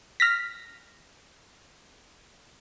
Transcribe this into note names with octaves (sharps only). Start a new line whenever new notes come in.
F6 A#6 B6